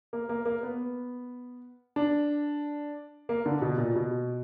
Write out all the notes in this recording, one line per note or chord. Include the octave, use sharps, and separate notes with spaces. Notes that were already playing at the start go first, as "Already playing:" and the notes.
A#3
A#3
A#3
B3
D4
A#3
D3
B2
A#2
B2